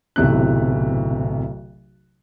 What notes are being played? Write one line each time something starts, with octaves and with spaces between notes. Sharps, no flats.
D1 B1 C3 E3 F#6